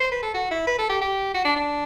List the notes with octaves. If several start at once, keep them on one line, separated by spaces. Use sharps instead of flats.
C5
B4
A4
F#4
E4
B4
A4
G4
G4
F#4
D4
D4